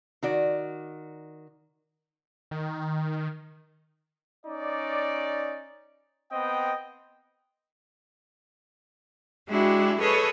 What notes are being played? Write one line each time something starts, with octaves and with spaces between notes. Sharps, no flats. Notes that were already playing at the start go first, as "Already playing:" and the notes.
D#3 F#4 D5
D#3
C#4 D#4 D5
B3 C4 D#5 G5
G#3 D4 E4 F#4 G4
G#4 A4 B4 C#5 D#5 C#6